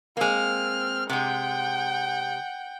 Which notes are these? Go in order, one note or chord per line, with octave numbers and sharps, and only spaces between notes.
G#3 A#3 C4 F6
C3 G#3 F#5 G5